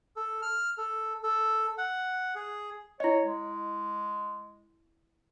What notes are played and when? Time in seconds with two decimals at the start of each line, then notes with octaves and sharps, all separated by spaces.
0.16 A4
0.42 F6
0.78 A4
1.23 A4
1.78 F#5
2.35 G#4
3.00 E4 C#5 D#5
3.24 G#3